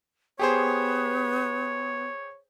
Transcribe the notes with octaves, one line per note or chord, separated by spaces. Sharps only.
B3 G4 G#4 C5 C#5